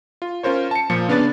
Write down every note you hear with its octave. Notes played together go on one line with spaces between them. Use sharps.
F4
C#4 F4 A#4 C5 C#5
A5 C#7
A#2 F3 F4 C#7
C#3 B3 D4 B4 D5 A6